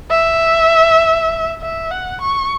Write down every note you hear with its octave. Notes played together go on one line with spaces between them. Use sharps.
E5
E5
F#5
C#6